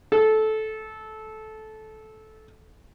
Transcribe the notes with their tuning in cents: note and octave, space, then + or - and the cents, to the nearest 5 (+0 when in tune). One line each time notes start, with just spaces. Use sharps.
A4 -15